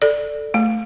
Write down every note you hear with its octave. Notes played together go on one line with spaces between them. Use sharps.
A4 D5
A3